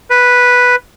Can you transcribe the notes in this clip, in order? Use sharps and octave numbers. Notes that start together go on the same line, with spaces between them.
B4